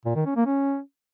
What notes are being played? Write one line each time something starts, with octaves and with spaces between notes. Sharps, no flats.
A#2
D#3
C#4
A#3
C#4